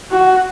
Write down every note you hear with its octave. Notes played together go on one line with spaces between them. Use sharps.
F#4